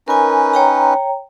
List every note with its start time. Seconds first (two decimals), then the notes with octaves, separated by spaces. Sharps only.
0.08 C#4 D#4 A#4 B4 G#5
0.53 C#5 G5 A#5